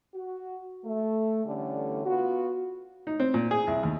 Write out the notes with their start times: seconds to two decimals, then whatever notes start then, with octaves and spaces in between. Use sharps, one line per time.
0.15 F#4
0.85 A3
1.45 D3 E3 G3 A3 C#4
2.05 B3 F4 F#4
3.07 D#4
3.20 C4
3.34 A#2
3.51 G#4
3.67 C2
3.83 D#2